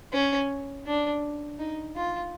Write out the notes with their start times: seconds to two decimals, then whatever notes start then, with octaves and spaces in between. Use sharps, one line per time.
0.13 C#4
0.86 D4
1.59 D#4
1.96 F4